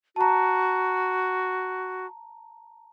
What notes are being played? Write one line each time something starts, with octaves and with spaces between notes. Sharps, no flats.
F#4 A5 A#5